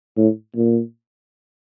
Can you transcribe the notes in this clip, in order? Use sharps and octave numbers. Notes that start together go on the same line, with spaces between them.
A2
A#2